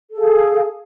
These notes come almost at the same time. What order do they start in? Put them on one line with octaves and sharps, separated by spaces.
A4 G#4 F5